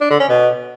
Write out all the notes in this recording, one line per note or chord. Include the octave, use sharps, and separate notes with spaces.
D4
D3
C#4
B2